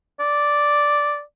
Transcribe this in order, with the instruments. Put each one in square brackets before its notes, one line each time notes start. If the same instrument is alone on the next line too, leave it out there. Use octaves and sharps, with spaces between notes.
[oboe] D5